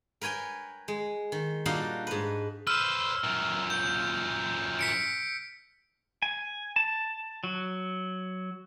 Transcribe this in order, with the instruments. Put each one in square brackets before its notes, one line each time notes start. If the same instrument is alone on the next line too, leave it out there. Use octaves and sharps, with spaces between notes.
[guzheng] A#4 B4 C#5 G5 G#5
G#3
D#3
A#2 G3 D4 D#4 F#4 F5
G#2 B4
[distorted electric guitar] B4 C5 [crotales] E6 F6
[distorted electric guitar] F#2 A#2
[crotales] G6
B6 C#7 D7
[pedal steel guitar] G#5
A5
F#3